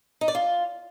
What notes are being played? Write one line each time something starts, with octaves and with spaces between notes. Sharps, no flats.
D#4
D5
F4